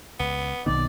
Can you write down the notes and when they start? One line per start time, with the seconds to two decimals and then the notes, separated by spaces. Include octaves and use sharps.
0.20 C#2 B3
0.66 B1 B2 D#3 B3 C4 D5